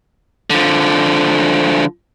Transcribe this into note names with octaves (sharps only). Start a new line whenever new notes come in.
D3 F3